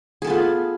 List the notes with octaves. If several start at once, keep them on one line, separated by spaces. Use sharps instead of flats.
B3 F4 G#4 A4